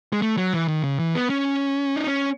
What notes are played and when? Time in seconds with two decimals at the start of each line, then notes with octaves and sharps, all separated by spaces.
0.13 G#3
0.22 A3
0.37 F#3
0.53 E3
0.68 D#3
0.84 C#3
0.99 E3
1.14 B3
1.30 C#4
1.96 D#4
2.07 C#4